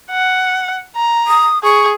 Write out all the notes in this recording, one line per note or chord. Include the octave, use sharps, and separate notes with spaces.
F#5
A#5
D#6
G#4 C#6